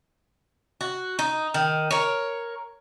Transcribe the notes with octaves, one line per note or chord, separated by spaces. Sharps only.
F#4
D#4
D#3
A#4 C#5